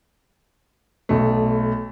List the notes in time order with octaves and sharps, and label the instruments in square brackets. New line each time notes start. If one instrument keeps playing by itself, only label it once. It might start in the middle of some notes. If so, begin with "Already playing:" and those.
[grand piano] B1 A3